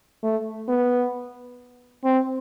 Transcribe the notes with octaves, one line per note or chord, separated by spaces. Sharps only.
A3
B3
C4